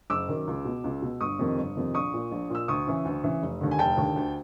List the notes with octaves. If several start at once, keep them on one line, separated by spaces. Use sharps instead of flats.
F#1 D6 E6
F#2 D#3
C#2
B2
C#2
B2
G1 C#6 D#6
F2 C3 D#3
G1
F2 C3 D#3
A#1 C#6 D#6
A#2
A#1
A#2 E6
D2 C#6 D#6
C#3 E3
D2
C#3 E3
F1
D#2 D3
G#5
F1 G5 A5
D#2 D3
D2